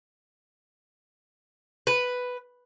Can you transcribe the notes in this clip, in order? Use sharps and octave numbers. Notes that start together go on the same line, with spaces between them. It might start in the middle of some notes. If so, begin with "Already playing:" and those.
B4